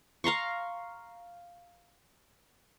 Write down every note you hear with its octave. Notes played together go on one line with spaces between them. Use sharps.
F5 A#5 C6 C#6